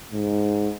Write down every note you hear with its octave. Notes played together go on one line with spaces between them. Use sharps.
G#2